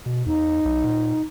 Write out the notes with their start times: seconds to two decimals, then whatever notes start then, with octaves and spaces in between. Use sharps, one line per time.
0.06 B2
0.26 E2 D#4
0.65 B1
0.84 A#2